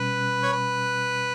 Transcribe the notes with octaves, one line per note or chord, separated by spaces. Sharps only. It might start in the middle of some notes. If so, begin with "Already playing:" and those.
Already playing: B2 G3 C#4 B4
C#5
B4